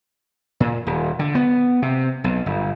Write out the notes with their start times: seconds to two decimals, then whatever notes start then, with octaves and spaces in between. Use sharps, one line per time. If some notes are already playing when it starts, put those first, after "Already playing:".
0.60 A#2
0.87 D#1
1.19 D3
1.35 B3
1.82 C3
2.24 B1
2.46 G1